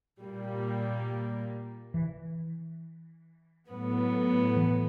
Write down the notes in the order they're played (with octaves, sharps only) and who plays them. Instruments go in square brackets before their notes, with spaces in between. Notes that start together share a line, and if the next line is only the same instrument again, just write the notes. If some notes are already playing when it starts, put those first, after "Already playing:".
[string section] A#2 G3 A#3
[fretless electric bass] E3
[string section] A2 F#3 B3
[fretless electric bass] E3